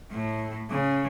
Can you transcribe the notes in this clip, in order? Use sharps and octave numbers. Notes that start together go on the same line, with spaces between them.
A2
C#3